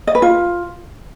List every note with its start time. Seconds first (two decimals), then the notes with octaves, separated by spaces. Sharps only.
0.07 D#5
0.15 B4
0.22 F4